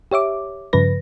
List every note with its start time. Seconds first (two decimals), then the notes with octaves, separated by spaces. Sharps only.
0.12 G4 C#5 E5 D6
0.73 G2 C#3 F3 B4 A#6